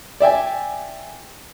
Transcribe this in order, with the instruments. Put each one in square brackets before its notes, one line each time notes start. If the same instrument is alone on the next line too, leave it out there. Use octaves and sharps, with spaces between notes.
[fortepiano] D5 E5 G5 G#5